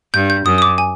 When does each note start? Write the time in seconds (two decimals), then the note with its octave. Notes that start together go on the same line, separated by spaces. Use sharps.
0.14 G2 G6
0.30 G6
0.46 F#2 D#6
0.58 D#6
0.62 D6
0.78 G#5